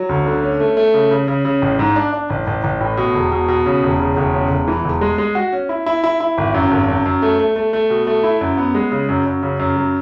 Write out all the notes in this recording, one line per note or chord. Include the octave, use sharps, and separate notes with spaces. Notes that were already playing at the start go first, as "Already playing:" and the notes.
Already playing: F#3
D2
D3
C#4
A3
A3
C#3
C#3
C#3
C#3
A1
G#2
D4
D4
A1
A1
A1
A2
B2
E1
B2
B2
C#3
E1
C#3
E1
C#3
E1
E3
E1
G#3
G#3
F#4
C#4
E4
E4
E4
E4
G#1
F#2
G#1
F#2
F#2
A3
A3
A3
A3
B2
A3
E4
F#2
B3
G#3
C#3
F#2
F#2
C#3
F#2
F#3